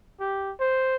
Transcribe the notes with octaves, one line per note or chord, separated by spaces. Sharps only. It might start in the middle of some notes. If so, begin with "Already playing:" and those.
G4
C5